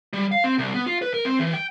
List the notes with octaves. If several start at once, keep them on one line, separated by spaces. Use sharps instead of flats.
G3
F5
C4
C2
B3
F4
B4
A#4
C4
E3
G5